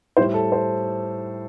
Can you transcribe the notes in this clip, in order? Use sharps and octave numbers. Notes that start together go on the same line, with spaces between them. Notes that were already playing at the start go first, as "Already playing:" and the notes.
A2 G3 C5
A4
C5